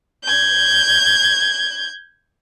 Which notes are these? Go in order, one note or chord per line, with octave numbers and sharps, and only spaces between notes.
G6 G#6